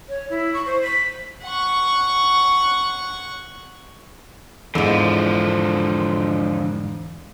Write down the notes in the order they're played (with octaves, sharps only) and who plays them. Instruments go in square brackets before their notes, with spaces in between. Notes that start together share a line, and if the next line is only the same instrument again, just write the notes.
[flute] C#5
E4
C#6
C5
B6
[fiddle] F#5 C#6
[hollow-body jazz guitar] E2 G#2 [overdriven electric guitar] D3 F3